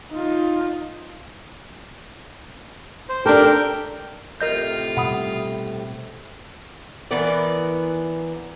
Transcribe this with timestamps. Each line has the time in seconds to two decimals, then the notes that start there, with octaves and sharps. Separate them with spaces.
0.11 D#4 F4
3.09 C5
3.26 D4 G4 A4 A#4 G5
4.41 A2 C3 F4 A#4 D#5 G6
4.97 B2 G3 F#5 B5 D#6
7.11 E3 B3 A#4 D5